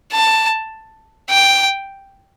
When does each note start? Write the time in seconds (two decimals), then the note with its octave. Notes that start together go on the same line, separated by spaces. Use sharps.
0.13 A5
1.30 G5